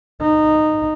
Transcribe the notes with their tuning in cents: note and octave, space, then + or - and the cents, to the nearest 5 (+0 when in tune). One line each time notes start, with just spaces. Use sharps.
D#4 -15